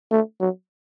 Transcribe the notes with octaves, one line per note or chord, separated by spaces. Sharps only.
A3
F#3